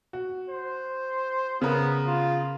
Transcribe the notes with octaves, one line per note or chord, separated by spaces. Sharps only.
F#4
C5
C#3 B3 A#4
F4